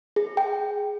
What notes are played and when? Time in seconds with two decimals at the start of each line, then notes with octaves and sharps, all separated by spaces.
0.16 G#4
0.37 G5